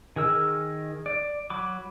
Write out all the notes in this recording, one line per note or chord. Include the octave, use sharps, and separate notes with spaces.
D#3 G#4 A#4 E6
D5
F#3 B5 D6